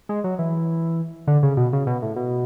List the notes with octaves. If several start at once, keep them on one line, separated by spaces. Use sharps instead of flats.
G#3
F#3
E3
D3
C#3
B2
C#3
B2
A2
B2